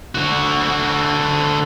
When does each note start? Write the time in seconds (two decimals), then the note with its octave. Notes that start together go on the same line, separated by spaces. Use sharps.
0.15 D3 F#4